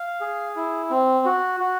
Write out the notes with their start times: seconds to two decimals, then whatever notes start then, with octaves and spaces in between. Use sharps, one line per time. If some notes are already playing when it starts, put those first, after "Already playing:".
Already playing: F5
0.21 G#4
0.56 E4
0.90 C4
1.25 F#4
1.60 F#4